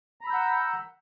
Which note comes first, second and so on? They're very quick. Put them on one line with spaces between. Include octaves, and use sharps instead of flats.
A#5 B5 E6 G6 F#5